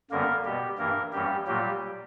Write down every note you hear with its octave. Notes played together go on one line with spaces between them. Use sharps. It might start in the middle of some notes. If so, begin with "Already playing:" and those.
F#2 D3 G3 A#3 B3 A#4
B2 G3 B3 G4
G2 E3 A#3 A#4
F#2 E3 G3 A#3 C#4 G4
A#2 F#3 G3 A#3 G4